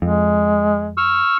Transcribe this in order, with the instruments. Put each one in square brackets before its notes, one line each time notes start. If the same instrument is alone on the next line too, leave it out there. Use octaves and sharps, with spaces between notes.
[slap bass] F2 [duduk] G#3
[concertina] C#6 E6 F6